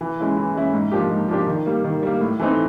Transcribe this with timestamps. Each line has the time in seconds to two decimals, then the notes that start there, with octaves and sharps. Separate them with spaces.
0.01 E3
0.19 G#3 C#4 E4
0.37 E3
0.55 G#3 C#4 E4
0.74 G#2
0.92 F3 A#3 D4 G4
1.10 G#2
1.28 F3 A#3 D4 G4
1.47 D#3
1.66 G3 A#3
1.84 D#3
2.03 G3 A#3
2.21 A2
2.39 E3 A3 C4 D#4